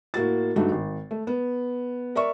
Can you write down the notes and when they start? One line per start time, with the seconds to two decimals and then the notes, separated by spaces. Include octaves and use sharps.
0.14 A2 A#3 F#4 A6
0.56 G2 A3 D#4 F#4
0.71 G#1
1.11 A3
1.27 B3
2.15 A#4 D5 E5 C#6